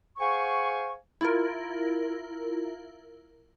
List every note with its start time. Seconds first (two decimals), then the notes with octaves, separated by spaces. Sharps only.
0.19 G#4 C5 F5 F#5 G#5 C#6
1.21 E4 F4 A#4